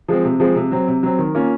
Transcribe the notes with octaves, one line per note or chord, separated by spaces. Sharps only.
F3 G#3 C4
C3
F3 G#3 C4
C3
F#3 C4
C3
F#3 C4
D#3
A#3 C#4 F4